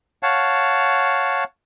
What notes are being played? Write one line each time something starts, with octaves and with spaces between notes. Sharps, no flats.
C#5 F5 F#5 A5